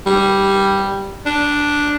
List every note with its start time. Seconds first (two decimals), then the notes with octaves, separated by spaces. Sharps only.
0.06 G3
1.26 D4